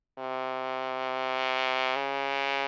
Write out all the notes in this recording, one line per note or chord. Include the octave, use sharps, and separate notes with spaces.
C3
C#3